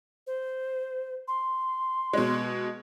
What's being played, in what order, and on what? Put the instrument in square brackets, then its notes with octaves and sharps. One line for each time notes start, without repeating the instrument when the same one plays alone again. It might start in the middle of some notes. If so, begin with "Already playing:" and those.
[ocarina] C5
C6
[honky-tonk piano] B2 G#3